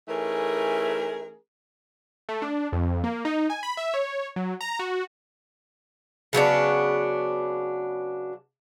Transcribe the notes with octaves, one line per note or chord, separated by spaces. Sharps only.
E3 A3 C#4 D#4 G#4 A#4
A3
D4
F2
A#3
D#4
G#5
B5
E5
C#5
F#3
A#5
F#4
C#3 F#3 B3 D4